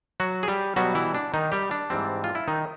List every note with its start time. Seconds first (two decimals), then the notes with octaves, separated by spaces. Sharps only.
0.20 F#3 F#4
0.43 G#4
0.48 G3 G4
0.76 B2 F#3 G3 B3 F#4
0.95 E3 E4
1.15 D4
1.34 D#3 D#4
1.52 G3 G4
1.71 D4
1.90 G#2 E3 G3 C4
2.24 F4
2.35 E4
2.48 D#3 D#4